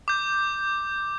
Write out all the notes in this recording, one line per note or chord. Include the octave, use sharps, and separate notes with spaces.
D6 G6